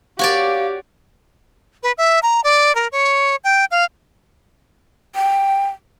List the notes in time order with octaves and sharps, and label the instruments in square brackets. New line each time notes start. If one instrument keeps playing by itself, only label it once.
[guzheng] F#4 C#5 D5 [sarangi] G4 [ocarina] F5
[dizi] B4
E5
A#5
D5
A#4
C#5
G5
F5
[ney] G5